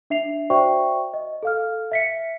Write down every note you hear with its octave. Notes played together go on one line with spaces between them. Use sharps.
D4 E5 C7 F7
F#4 C5 D5 E5 G5 C#6
D#5
A4 F5 F6
E5 B6 C#7